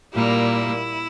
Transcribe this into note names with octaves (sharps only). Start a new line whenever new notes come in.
A#2 G3 A#3 E4